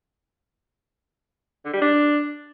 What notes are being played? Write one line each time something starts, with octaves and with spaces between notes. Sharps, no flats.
D3
G3
D4